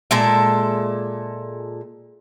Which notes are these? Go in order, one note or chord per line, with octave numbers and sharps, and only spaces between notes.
A#2 G#3 A4 E5